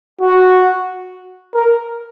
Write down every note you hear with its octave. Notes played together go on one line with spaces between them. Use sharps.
F#4
A#4